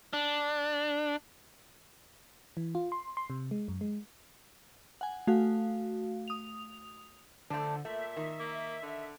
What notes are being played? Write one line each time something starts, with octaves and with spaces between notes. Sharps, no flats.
D4
E3
F4
C6
C6
C3
G#3
F#2
G#3
F#5 G#5
A3 F#4 F5
D#6 F7
D3 F3 A3 D4
A#2 A3 E5
D#3
A#3
D3